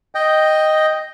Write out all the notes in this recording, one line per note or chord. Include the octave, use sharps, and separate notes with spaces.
D#5 G5